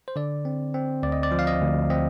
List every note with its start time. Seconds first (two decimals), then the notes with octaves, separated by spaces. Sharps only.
0.08 C5
0.16 D3 D5
0.45 C4
0.74 C4
1.03 D2 D5
1.12 D#5
1.23 D5
1.31 F3
1.39 F5
1.47 D#5
1.61 D2
1.90 C4 D#5